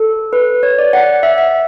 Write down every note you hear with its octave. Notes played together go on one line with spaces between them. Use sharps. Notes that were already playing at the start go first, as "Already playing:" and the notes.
Already playing: A4
B4
C#5
D5
F#5
E5
E5